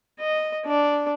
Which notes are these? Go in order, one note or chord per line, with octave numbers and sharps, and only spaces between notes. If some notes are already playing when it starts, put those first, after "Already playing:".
D#5
D4 D5